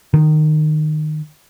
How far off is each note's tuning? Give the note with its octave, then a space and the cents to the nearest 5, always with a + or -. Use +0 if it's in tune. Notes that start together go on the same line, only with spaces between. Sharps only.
D#3 -20